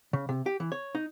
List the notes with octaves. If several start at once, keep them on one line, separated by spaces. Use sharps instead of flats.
C#3
C3
G4
E3
C#5
D#4